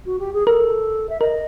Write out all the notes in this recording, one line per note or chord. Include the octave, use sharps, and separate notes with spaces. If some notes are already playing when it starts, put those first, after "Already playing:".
F#4
G4
G#4
A4 A#4
E5
A#4 D#5